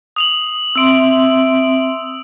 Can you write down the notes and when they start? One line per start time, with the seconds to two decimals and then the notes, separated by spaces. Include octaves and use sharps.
0.16 D#6 F7 F#7
0.76 C4 E5 C6 E6 D7